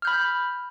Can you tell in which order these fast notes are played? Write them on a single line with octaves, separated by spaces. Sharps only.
F6 G6 B5